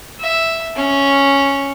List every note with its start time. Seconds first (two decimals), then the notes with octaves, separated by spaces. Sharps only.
0.20 E5
0.76 C#4